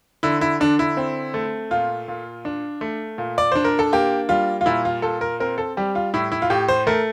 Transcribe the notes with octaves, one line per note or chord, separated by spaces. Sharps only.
D3 E4
E4
D3 D4
E4
C4
A3
A#2 F4
A#2
D4
A3
A#2
D5
D4 C5
A#4
A4
A#3 G4
G3 F4
F4
A#2 E4
F4
A#2 A4
A#4
C4 A#4
A4
G3 G4
F4
A2 E4
E4
F4
A2 G4
C5
A3 A#4